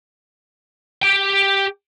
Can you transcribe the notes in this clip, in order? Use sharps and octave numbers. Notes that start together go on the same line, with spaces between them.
G4 G5